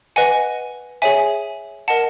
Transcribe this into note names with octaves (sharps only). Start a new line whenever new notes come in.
B4 D#5 F#5 G#5
G#4 C#5 E5 G#5
A#4 D#5 F#5 A5